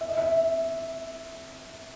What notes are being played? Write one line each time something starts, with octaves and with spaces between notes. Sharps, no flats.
E5
D#5
E5